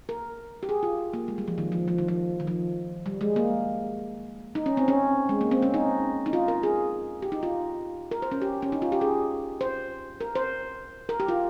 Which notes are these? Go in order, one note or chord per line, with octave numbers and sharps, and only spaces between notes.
A#4
G4
G#4
F4
A#3
G#3
G3
F3
D#3
F3
F3
D#3
F3
D#3
F3
G3
G#3
A#3
D#4
C#4
C4
C#4
G#3
A#3
C4
C#4
D#4
D#4
F4
A#4
G#4
G4
D#4
F4
A#4
C5
C#4
G4
C#4
D#4
F4
G4
G#4
C5
A#4
C5
A#4
G4
F4